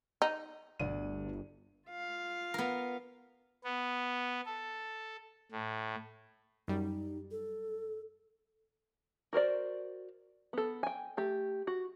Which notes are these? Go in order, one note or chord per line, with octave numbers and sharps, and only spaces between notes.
D#4
G1 D2 D5 D#7
F4 F5
B3 A#4
B3
A4
A2
F#2 G3 D#4
A4
F#4 A#4 C5 D5
B3 A4
G5 G#5
A3 G4
F#4